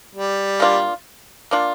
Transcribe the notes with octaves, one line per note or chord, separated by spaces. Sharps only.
G3
A#3 D4 F4
A#3 D4 F4